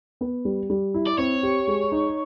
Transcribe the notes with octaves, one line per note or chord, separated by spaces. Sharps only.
B3
G3
G3
E4
D5
C4 C#5
G4
G#3
D#4